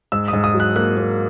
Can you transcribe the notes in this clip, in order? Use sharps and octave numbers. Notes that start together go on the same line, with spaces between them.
G#2 E6
D#6
G#2
D#6
F#3
F#6
A#3 F#6
A#3